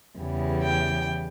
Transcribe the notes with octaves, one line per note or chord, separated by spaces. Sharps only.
E2 C#3 E3 G3
G5